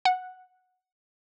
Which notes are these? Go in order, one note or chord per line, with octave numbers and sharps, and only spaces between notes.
F#5